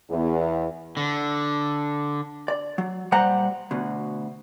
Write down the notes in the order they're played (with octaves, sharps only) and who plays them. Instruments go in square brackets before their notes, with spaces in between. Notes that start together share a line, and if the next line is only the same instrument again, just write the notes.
[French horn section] E2
[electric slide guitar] D3
[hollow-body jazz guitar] D5
F#3
A#2 G3 C5 F#5 A#5
D2 B2